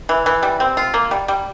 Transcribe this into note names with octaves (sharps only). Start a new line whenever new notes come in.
E3
E3
G3
C4
F4
A#3
G3
G3